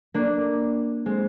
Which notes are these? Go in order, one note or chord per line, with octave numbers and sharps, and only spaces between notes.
A#3 D4
G#3 C4